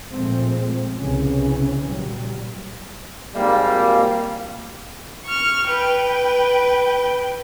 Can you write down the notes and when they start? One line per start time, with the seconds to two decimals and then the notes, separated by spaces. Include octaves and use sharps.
0.11 A#2 F3 G#3 A3 C4
0.96 C2 C#3 E3 C#4
1.86 A#2 F#3 G3
3.34 G#1 G3 A#3
5.26 C#6 F6
5.69 B4 G5